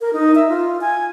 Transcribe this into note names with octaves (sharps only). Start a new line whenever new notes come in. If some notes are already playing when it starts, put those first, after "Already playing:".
A#4
D#4
E5
F4
G#5